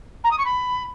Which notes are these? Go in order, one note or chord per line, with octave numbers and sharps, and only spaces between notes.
A#5
D#6
C#6
B5